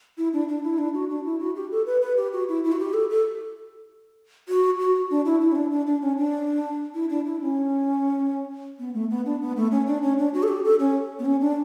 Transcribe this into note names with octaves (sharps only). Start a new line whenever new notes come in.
E4
D4
D4
E4
D4
F#4
D4
E4
F#4
G4
A4
B4
B4
G4
F#4
E4
E4
F#4
G4
A4
A4
F#4
F#4
D4
E4
E4
C#4
D4
D4
D4
C#4
D4
E4
D4
E4
C#4
B3
A3
B3
D4
B3
A3
C#4
D4
C#4
D4
F#4
A4
G4
A4
C#4
B3
C#4
D4